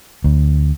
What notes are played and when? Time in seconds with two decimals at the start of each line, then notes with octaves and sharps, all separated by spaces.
0.24 D2